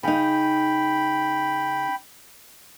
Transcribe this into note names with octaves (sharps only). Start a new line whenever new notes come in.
C#3 D#4 G5 B5